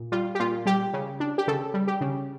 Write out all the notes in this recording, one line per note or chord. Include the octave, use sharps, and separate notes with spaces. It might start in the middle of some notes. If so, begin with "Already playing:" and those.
Already playing: A#2
G3 F4
G4
A#2 F4
G3 G4
C#3
D4
G4
C#3 A4
G3
G4
C#3